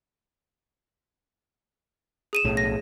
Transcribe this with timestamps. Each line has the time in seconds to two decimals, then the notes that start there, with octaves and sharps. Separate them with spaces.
2.33 G#4 D#7 E7
2.44 B1 A2
2.57 A#6